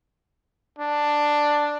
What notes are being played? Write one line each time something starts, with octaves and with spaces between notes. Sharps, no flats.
D4